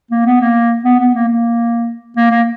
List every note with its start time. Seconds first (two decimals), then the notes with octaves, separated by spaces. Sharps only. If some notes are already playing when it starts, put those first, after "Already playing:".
0.11 A#3
0.26 B3
0.41 A#3
0.85 B3
1.00 B3
1.14 A#3
1.28 A#3
2.17 A#3
2.31 A#3